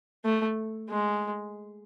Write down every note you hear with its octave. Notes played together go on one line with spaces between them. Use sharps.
A3
G#3